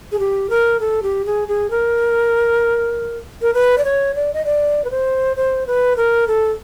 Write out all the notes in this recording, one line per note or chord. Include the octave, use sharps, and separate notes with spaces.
G#4
G4
A#4
A4
G4
G#4
G#4
A#4
A#4
B4
D5
C#5
D5
D#5
D5
B4
C5
C5
B4
A#4
A4